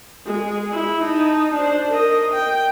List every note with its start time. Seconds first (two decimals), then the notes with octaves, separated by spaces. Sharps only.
0.26 G#3
0.72 E4
1.02 D#4 A5
1.54 D4 C5
1.88 A#4 D#5
2.33 G5